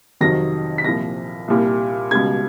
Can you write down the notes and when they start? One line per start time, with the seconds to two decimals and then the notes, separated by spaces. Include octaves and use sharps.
0.21 F2 C3 D#3 F#3 A#6
0.78 B6
0.84 C2 A#2 F3 A#6
1.48 C2 A#2 G3
2.11 C#2 B2 G3 G#6